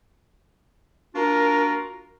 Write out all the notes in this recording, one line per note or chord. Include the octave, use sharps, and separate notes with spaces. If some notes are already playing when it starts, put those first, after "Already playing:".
A#3 D4 F4 F#4 A#4